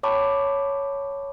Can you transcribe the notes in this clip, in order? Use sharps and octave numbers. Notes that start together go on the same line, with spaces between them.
C#5 G5 A5 B5 C#6 D6